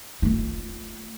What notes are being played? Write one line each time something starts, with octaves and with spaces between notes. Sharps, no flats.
A3 F4